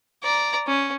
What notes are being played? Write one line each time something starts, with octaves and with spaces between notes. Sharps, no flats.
D5 A#5
C#4